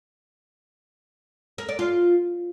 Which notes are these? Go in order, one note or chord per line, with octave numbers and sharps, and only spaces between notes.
A#4
D5
F4